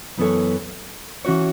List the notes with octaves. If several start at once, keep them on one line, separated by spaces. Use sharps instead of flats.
F#2 E3 B3 A4 C#5
E3 C#4 F#4 C#5